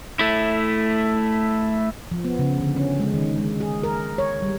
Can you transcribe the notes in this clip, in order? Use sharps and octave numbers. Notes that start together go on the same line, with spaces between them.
A3 E4
F3
B3
C#3
D3
C#4
G#3
D#3
G#3
G#4
A#4
C#5
G3